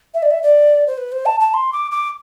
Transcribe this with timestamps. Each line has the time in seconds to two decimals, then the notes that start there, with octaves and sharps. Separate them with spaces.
0.14 E5
0.22 D5
0.30 E5
0.43 D5
0.87 C5
0.97 B4
1.12 C5
1.25 A5
1.40 A5
1.54 C6
1.72 D6
1.91 D6